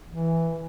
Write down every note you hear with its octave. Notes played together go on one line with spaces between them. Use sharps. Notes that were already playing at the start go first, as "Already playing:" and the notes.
E3